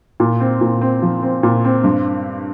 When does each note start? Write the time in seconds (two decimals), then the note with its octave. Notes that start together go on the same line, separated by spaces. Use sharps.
0.20 A#2
0.40 C4
0.61 A#2
0.81 C4
1.02 F3
1.23 C4
1.43 A#2
1.64 C4
1.84 G2